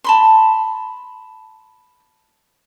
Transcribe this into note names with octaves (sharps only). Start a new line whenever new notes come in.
A5 B5 C6